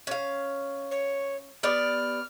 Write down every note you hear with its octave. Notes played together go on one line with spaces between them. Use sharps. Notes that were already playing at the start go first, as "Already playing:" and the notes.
C#4 F5
C#5
B3 G4 D5 F6